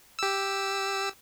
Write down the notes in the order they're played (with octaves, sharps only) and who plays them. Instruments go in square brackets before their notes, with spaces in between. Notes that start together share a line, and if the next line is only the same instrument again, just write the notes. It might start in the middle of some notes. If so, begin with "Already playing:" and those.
[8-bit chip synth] G4 E6